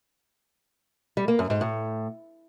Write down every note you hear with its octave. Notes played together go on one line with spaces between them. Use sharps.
G3
A#3
F#2
G#2
A2